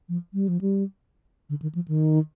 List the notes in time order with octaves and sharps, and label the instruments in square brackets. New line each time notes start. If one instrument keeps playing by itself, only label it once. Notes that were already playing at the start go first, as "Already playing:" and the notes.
[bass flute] F3
G3
F3
G3
D3
D#3
F3
D#3